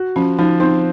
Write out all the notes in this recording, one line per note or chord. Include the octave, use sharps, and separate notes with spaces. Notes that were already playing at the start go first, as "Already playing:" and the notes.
Already playing: F#4
F3 C#4
F3 D#4
C4 D#4